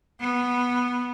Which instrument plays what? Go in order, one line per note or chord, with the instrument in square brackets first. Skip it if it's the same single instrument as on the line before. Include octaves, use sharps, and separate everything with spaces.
[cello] B3